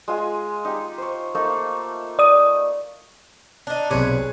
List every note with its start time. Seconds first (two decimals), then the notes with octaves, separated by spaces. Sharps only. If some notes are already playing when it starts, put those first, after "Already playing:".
0.08 G#3 F4 G#5
0.65 D#4 G4
0.98 C5 C#5
1.35 A3 A#3 D#4
2.19 D5 D#6
3.67 D4 D#4
3.91 B1 C3 G#4 B4 C#5